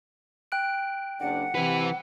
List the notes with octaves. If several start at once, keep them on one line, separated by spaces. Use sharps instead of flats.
G5 F#6 D7
F#1 D4 F#5
C3 E3 B4